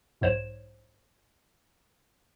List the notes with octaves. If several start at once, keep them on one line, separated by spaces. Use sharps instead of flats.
B1 G#2 C5 C#5 E7